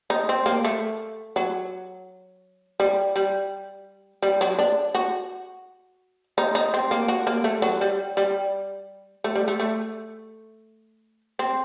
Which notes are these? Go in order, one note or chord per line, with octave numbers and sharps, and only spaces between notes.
D#4
C4
A#3
A3
F#3
G3
G3
G3
F#3
D4
F#4
D#4
D#4
C4
A#3
F#4
A#3
A3
F#3
G3
G3
A3
G3
A3
A3
C4